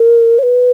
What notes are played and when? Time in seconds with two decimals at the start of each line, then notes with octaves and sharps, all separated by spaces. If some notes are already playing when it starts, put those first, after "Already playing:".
Already playing: A#4
0.39 C#5
0.43 B4